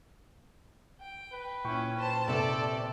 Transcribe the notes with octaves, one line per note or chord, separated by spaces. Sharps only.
G5
B4
A#2 C#4 E4 G5 C#6
C5 A5
C3 A4 D5